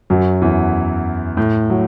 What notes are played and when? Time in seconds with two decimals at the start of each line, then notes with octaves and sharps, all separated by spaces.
0.10 F#2 F#3
0.42 E2 E3
1.37 A2
1.70 F#3